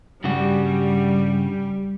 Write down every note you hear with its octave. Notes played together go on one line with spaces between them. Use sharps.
G2 C#3 G3 F#4